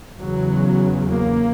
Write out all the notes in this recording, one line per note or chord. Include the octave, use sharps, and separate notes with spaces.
E2 C#3 F#3
A#3